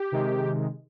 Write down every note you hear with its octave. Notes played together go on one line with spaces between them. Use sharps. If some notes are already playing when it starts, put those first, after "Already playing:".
Already playing: G4
C3 D#3 G#3